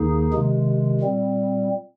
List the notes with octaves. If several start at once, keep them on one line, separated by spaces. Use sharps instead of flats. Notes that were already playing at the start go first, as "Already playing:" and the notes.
Already playing: D#2 D#3 A#3 D#4 G#4
C3 D#3 G#3
A#2 G3 C4